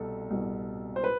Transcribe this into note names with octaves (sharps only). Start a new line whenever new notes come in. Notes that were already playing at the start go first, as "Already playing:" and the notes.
Already playing: C2 B2 A4
C2 B2
C5
B4